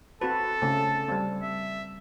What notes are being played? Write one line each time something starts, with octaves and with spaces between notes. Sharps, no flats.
C4 F#4 A4 B4 A5
C#3 A3 C4
G3 C4
E5